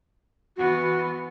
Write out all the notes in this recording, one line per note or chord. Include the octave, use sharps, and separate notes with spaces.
E3 B3 F#4